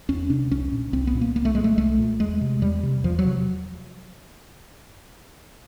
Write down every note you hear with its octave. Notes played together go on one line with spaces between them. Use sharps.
E2 C#4
C3 D4
C2 C#4
A#2
C2 C4
B3
A#2
A#3
C2 A#3
A3
A#2 G#3
A3
C2 A3
A#2
E2 G#3
C3
E2 G3
C3
E2 F3
F#3
C3